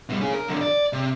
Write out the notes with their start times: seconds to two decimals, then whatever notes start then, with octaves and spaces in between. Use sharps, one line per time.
0.09 B2 G3
0.21 C#4 G#4
0.34 A#4
0.48 F#2 D3
0.61 D5
0.93 C3